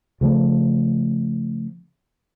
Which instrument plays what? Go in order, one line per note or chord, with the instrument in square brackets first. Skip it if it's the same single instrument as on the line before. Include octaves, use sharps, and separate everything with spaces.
[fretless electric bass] C#3 F3 A3